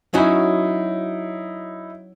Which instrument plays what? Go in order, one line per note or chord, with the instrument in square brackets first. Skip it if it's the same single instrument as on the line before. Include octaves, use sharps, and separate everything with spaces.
[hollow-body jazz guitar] F#3 C#4 F#4 [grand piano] D#4 E4